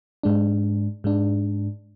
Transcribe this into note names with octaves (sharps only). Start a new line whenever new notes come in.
G#2 G#3 D4
G#2 G#3 D4